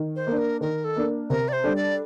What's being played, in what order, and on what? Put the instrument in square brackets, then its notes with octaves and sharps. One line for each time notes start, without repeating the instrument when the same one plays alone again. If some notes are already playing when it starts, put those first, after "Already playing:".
Already playing: [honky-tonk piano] D#3
[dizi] C5
[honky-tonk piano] A#3 D4
[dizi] A#4
[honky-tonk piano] D#3 [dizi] A#4
[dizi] A4
[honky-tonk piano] A#3 D4
[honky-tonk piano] C3 [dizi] A#4
[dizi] D5
C5
[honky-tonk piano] G3 D4 A4
[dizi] D5